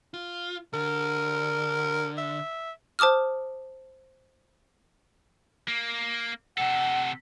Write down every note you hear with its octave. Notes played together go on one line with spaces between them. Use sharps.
F4
D3 A#4
E5
C5 A5 D6 D#6 F6
A#3
C3 A4 F#5